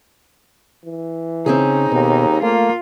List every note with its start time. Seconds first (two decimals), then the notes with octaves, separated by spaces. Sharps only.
0.85 E3
1.46 C#3 C4 C#4 D#4 G#4
1.92 D#2 B2
2.42 A3 A#3 F4